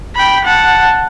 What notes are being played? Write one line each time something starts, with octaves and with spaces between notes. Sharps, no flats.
G5 B5
F#5 A5